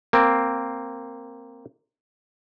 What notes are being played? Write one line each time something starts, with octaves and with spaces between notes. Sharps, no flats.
A#3 C4